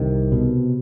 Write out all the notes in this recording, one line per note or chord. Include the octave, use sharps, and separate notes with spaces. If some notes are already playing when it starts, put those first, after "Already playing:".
Already playing: C2 C3 D#3
B2